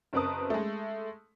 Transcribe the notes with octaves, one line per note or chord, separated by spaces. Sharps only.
F#1 C4 A#4 B4 A5 D#6
G#3 A3